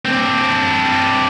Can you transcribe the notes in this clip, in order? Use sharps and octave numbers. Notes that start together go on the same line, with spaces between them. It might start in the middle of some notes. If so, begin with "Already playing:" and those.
C4 D4